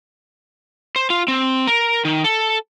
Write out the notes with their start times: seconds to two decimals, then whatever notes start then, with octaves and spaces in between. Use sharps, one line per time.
0.96 C5
1.10 F4
1.28 C4
1.67 A#4
2.05 D#3
2.24 A4